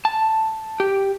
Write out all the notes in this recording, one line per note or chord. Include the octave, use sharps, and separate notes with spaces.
A5
G4